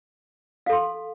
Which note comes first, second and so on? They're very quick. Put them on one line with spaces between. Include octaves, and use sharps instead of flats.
F5 A4 C6